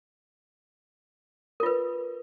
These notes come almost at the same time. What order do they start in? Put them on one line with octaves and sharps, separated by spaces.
A#4 F4 B4